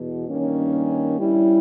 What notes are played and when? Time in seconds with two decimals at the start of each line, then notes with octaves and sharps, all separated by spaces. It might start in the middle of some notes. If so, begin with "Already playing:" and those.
Already playing: E2 B2
0.27 G2 D#3 A#3 C#4
1.19 G2 G3 C#4 E4